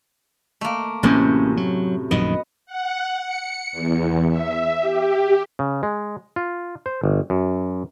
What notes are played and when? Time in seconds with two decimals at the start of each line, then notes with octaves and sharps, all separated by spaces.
0.61 A3 A#3
1.03 A1 F#2 A2 C3 A#3 C#4
1.57 F#3
2.11 A#1 F#2 D#3 B3 D#5
2.66 F#5
3.18 C#7
3.72 E2
4.30 E5
4.81 G4
5.59 C#3
5.83 G#3
6.36 F4
6.86 C5
7.04 G1
7.30 F#2